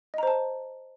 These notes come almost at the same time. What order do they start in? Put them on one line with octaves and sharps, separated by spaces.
D#5 A#5 C5 A5